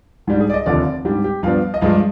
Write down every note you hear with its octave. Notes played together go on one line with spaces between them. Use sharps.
G#2 G3 D4
G#4
D5
D#5
F1 D#2 D3 F3 D5
G#2 G3 D4 G4
G4
G2 F3 B3 D4 F5
D#5
G2 F3 G#3 D4 F5